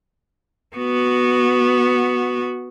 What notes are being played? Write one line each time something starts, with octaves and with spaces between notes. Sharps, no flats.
B3 F#4